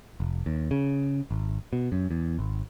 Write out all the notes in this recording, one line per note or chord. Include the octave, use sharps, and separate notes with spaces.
F1
D#2
C#3
G#1
B2
F#2
E2
G#1